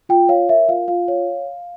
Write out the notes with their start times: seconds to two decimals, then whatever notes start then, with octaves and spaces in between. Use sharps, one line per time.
0.09 F4 G5
0.29 C#5 F5
0.49 A#4 E5
0.68 F4 F5
0.88 F4 F5
1.08 C#5